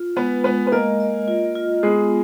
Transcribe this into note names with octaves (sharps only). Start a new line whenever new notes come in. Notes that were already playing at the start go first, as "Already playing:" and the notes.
Already playing: F4
G#3 B3 B4
G#3 B3 B4
B4
A#3 A#4 D#5
D#5
F4
F4
G#3 B3 G#4